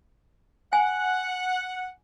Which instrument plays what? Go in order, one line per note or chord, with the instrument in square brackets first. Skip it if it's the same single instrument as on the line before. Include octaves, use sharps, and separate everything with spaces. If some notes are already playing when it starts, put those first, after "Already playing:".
[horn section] F#5 [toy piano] G#5